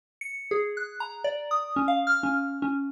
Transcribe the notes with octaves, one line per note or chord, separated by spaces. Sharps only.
C#7
G#4
F#6
A#5
D5
D#6
C#4
F5
F6
C#4
C#4